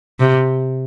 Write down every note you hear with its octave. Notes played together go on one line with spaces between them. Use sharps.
C3